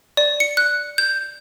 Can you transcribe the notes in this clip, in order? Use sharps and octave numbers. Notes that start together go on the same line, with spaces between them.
D5
C#7
F#6
G6